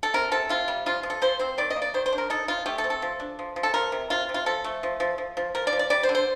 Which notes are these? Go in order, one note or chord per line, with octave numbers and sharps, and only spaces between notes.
A4
C3 A#4
C3 A4
C3 F4
G3
F3 F4
F3
A4
F3 C5
C4 C5
D#3 D5
D#5
A#3
D5
D#3 C5
C5
D4
A#4
D#4 A4
D#4 F4
A3 G4
A4
C4
A4
F3
D4
F3
F3
A4
F3 A#4
C3
C3 F4
C3
F4
F3 A4
A3
F3
F3
F3
F3
F3 A#4
D5
F3
D5
G3 D5
C5
D3
C5